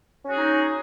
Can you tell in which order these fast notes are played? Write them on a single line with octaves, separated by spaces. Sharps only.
C#4 F#4 G#4 D#4